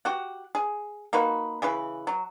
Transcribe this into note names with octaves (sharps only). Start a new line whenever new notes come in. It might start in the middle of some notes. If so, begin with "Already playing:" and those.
F#4 G4 F#5
G#4
A#3 D#4 F#4 B4
C#3 E3 B4
F#3